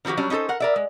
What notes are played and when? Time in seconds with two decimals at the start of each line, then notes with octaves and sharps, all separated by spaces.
0.05 D#3 F3 F#3 F#4 G4
0.17 F#3 G3 C#4 D4
0.30 C#4 D#4 G4 A4 C5
0.49 A#4 F#5
0.60 A#4 D5 E5
0.76 G#3